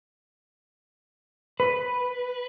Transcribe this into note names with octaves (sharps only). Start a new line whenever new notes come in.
B4